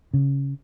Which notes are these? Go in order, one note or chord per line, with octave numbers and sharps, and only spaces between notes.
C#3